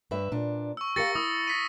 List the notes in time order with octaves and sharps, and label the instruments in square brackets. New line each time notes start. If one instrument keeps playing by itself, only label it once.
[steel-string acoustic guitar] G2 B4 E5
A#2 D4
[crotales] C#6 E6
[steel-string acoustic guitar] G4 A#4 F5 [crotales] A6 A#6 C#7
[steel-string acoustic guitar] E4 [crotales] D#6 E6
[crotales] A#6 B6 D#7